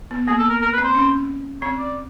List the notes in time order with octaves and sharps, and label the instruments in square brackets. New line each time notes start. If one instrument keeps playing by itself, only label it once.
[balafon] B3
[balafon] A#3 [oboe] G#4
[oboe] A4
A#4
A#4
B4
[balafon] C4
[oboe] C5
[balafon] C#4
[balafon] C4 [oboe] C#5
[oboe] D5